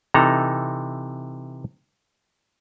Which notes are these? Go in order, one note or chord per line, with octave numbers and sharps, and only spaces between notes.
C3 E3 D#4 A4 A#5